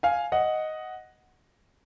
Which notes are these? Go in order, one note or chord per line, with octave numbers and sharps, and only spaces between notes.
F5 G#5
D#5 F#5